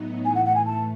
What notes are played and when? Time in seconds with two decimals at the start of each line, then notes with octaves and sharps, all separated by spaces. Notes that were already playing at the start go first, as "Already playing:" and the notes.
Already playing: A2 F#3 B3 D#4
0.24 A2 E3 A3 G#5
0.35 F#5
0.45 F#5
0.55 G#5
0.66 A5